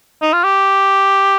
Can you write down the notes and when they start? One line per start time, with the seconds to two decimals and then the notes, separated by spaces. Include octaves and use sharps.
0.22 D#4
0.33 F4
0.44 G4